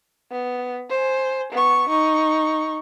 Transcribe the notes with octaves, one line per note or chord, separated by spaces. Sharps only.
B3
C5 G#5
B3 C#6
D#4 C#6